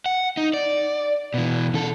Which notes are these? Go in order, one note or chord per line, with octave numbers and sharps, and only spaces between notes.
F#5
D#4
D5
B2 E3
C#3 A4